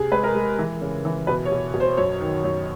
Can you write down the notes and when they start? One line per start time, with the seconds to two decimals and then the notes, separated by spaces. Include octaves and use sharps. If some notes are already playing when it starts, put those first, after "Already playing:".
Already playing: C3 G#4
0.11 G#3 B4
0.24 A#4
0.35 G#3
0.59 E3
0.81 C#3
1.05 E3
1.27 B2 B4
1.45 C#5
1.52 B2
1.74 B2
1.80 C5
1.97 F#2 C#5
2.20 D#3
2.44 F#2